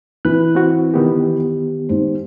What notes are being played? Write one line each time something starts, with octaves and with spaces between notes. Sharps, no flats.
E3 B4 F#6
C4 F#4
D#3 B3 G4
G#2 C5